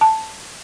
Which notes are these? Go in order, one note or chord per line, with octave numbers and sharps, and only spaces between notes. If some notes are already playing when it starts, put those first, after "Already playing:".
A5